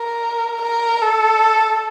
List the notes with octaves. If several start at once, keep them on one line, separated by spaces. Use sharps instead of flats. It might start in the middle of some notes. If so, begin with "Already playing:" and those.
Already playing: A#4
A#4
A4